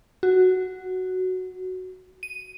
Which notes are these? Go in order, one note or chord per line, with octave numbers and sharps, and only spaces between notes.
F#4
D#7